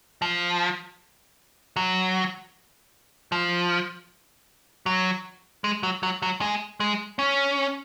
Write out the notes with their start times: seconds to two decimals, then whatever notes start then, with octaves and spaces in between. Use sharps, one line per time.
0.22 F3
1.76 F#3
3.32 F3
4.86 F#3
5.64 G#3
5.83 F#3
6.03 F#3
6.22 F#3
6.41 G#3
6.80 G#3
7.19 C#4